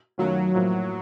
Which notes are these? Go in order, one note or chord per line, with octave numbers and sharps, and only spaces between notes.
F#2 D#3 F#3 A3 C#4 F4
A2 F3 A#3